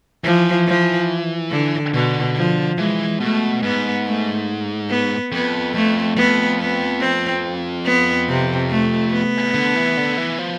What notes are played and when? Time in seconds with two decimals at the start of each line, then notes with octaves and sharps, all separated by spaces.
0.24 E3 F3
0.67 F3
1.51 D3
1.94 B2 D3
2.36 F3
2.78 E3 G#3
3.20 B2 A3
3.62 G#2 B3
4.06 A3
4.90 B3
5.32 F2 B3
5.74 F2 A3
6.16 F2 B3
6.59 B3
7.01 C4
7.85 B3
8.28 C3
8.70 A3
9.12 B3
9.54 D3
9.75 E3
9.97 D3
10.18 E3
10.39 F3